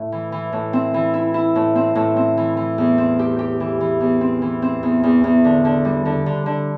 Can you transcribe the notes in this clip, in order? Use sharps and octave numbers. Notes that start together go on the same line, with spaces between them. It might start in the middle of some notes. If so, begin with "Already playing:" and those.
Already playing: A2
E3
E3
A2
C4
E3
E4
E4
A2
C4
A2
C4
E3
E3
E2
C4
G4
G4
E3
E3
E2
C4
E3
C4
E2
E2
E2
D3
D3
G3
D3
D3
D3